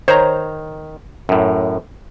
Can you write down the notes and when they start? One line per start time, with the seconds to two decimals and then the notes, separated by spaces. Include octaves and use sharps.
0.08 D#3 C5 C#5 A#5
1.29 F#2 A2